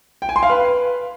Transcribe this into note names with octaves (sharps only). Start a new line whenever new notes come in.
G5
G#5
C6
F5
B4